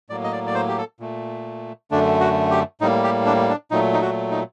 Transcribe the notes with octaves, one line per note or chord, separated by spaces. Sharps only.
A2 F#3 A#3 D5
D#5
D5
D5
C5
G4
A4
A#2 A3
F#2 D3 A3 D4
F#4
G4
A2 G3 A#3 D#4
G4
D4
D4
A#2 F#3 A3 D#4
D#4
F#4
D#4